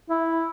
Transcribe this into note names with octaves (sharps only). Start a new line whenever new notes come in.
E4